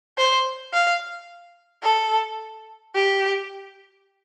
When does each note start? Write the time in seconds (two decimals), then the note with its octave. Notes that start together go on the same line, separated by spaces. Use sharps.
0.18 C5
0.73 F5
1.83 A4
2.95 G4